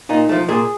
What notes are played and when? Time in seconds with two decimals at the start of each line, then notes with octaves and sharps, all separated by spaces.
0.09 A#2 D#4
0.29 F3 A3
0.48 A#2 G#4